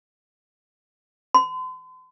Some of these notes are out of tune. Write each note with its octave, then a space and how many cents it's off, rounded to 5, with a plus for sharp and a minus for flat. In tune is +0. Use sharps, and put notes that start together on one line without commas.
C6 -45